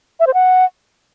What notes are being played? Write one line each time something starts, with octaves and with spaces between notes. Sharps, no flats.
E5
C5
F#5